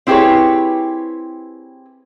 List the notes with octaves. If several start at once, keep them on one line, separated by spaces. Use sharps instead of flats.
C4 E4 G4 G#4 B4 C#5